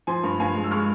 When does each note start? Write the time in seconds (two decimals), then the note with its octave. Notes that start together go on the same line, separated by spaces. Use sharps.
0.07 F3 G#5 C6
0.24 G2
0.40 G2 F5 G#5
0.55 G#3
0.64 E6
0.71 G#3 C#6 F6